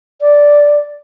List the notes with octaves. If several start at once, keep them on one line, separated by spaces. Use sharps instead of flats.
D5